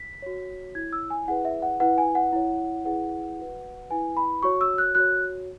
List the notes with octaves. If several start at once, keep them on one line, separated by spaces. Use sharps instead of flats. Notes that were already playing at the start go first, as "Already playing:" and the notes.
Already playing: B6
F#4 C#5
E4 C#5 G#6
E6
G#5
E4 G#4 B4 F#5
E5
F#5
E4 B4 F#5
G#5
F#5
E4 C#5
E4 G#4 B4 F#5
F#4 B4
E4 B4 G#5
B5
F#4 C#5 C#6
E6
F#6
F#4 C#5 F#6